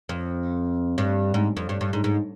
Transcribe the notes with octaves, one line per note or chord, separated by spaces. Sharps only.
F2
G2
G#2
F2
G2
G2
G#2
G#2